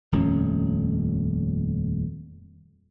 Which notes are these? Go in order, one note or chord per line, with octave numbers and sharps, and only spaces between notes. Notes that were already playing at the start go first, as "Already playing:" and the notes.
D#1 F2 A3 C#4